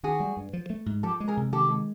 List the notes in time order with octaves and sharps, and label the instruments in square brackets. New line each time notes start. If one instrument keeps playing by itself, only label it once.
[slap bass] D#3 [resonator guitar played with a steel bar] F#4 G#4
[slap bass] G3
G2
F3
A3
G#2
[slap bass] F3 [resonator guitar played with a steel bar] G4 A4
[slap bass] G#3
[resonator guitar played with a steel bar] G#4 A#4
[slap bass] C3
[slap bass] D#3 [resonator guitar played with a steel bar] G4 A4
[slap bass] G#3